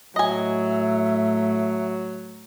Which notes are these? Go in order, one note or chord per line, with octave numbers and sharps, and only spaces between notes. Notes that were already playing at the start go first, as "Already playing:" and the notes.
A2 F#3 D#5 E5 G#5